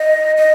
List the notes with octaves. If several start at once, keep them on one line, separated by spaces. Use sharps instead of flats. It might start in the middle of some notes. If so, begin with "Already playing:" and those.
Already playing: D#5
D#5